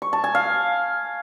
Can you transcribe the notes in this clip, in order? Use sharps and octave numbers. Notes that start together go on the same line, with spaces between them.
C#6
A5
G#5
F5